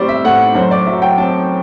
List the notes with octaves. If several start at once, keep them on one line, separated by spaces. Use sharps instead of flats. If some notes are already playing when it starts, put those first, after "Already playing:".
Already playing: A2 G3 C4 C5 D5
E5
A2 F#5
F#2 C5
D5
F#3 E5
G5
C4 A5